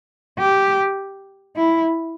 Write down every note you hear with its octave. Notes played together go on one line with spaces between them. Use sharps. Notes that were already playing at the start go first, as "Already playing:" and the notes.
G4
E4